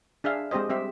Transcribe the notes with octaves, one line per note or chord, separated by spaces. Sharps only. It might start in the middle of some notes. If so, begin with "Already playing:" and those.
D4 G#4 E5 F5
G#3 C4 G4 C5 D#5
G3 C4 G4 E5